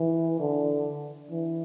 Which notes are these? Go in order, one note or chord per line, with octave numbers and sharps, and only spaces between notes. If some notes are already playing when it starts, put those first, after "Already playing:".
Already playing: E3
D3
E3